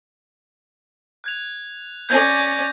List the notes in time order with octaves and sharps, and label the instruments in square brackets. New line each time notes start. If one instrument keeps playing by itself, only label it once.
[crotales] F#6 G#6 F7
[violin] C#4 D5 [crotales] G6 G#6 A#6